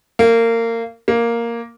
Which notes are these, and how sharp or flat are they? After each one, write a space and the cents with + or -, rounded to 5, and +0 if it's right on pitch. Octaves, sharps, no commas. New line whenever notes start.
A#3 -25
A#3 +0